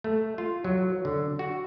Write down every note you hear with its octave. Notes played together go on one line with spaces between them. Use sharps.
A3
F4
F#3
D3
F#4